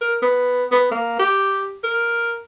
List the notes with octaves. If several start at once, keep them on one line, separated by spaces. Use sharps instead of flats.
A#4
B3
B3
A#3
G4
A#4